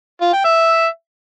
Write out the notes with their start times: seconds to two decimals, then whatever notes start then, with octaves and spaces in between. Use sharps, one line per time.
0.21 F4
0.33 G5
0.45 E5